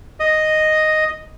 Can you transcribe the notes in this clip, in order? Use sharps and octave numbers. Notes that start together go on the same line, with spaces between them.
D#5